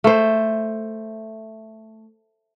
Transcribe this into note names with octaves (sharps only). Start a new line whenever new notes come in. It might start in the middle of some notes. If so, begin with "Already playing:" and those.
A3 C5